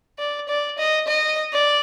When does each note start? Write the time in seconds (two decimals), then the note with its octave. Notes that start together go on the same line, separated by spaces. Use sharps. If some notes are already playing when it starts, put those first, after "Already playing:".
0.19 D5
0.49 D5
0.78 D#5
1.08 D#5
1.53 D5